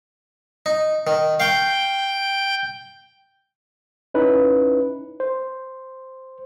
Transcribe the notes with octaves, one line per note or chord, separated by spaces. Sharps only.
D#4
D#3
F5 G5 C#6
C#4 D#4 E4 B4
C5